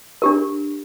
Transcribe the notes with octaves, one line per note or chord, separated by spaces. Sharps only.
D4 G4 A#4